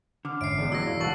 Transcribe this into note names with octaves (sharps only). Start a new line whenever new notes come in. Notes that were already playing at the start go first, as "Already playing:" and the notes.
D3 D6 F6
G#1 C#4 E5 C7 D7
E1 B3 G#4
A2 F#3 F#4 E6 A#6
G2 A#2 E3 F5
F#1 C#2 A4 C#5 F#5 C#6 E6 F#7